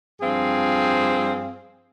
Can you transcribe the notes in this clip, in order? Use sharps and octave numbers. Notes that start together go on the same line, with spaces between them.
G2 F3 C4 G#4 F5